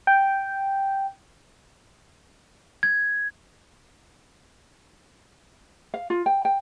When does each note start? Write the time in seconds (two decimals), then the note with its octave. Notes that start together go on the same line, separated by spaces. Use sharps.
0.07 G5
2.83 G#6
5.94 F5
6.10 F4
6.26 G5
6.45 G5